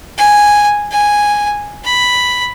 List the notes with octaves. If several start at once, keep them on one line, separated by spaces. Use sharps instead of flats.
G#5
G#5
B5